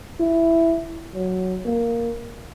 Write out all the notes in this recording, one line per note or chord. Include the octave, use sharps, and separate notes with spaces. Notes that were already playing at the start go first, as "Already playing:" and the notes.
E4
F#3
A#3